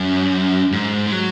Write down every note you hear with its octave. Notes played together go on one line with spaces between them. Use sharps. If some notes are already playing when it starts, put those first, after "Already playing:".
Already playing: F#2
G#2
G#3
F#3